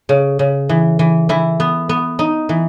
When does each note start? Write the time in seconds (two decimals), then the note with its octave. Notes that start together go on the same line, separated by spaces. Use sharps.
0.09 C#3
0.39 C#3
0.69 E3
0.99 E3
1.29 E3 E4
1.60 B3
1.89 B3
2.19 D#4
2.49 E3